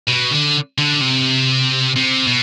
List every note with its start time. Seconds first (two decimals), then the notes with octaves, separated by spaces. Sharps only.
0.07 B2
0.31 D3
0.78 D3
1.01 C3
1.96 C3
2.27 B2